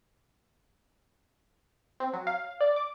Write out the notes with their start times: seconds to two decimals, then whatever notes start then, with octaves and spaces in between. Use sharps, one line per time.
2.00 C4
2.14 F#3
2.27 F5
2.61 D5
2.76 D6